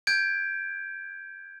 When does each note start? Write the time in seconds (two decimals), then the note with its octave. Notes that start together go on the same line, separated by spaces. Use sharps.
0.07 G6 G#6 D7